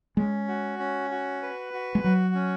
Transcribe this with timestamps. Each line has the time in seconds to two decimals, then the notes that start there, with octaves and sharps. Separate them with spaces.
0.17 G#3 C#4
0.48 F#4
0.79 C#4
1.10 F#4
1.42 B4
1.73 F#4
1.95 G#3
2.04 F#3 F#4
2.35 C#4